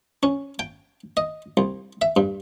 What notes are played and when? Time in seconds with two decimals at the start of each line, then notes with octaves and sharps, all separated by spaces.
0.23 C#4
0.59 G5
1.17 D#5
1.57 C2
2.02 E5
2.17 G2